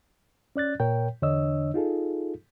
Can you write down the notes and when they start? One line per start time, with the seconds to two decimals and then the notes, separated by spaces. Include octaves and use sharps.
0.56 C#4 D5 F#6 A6
0.80 A#2 A#4 C#5 G5
1.22 E2 D3 D4 C#5 D#5 E6
1.74 D#4 F4 G#4 A4